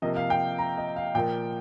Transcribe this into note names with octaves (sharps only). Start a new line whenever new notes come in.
C3 F3 A#3 D#5
F5
G5
A#5
D#5
F5
A#2 F3 A#3 G5